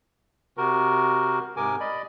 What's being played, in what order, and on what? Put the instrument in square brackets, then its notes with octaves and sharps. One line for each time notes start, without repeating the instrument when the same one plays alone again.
[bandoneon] C3 F#4 A#4
G#2 C3 A#4 G#5 D6
D5 D#5 B5